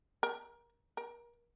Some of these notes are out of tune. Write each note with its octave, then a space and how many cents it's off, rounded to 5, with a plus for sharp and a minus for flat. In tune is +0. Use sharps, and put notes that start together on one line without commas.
A#4 +25
A#4 +30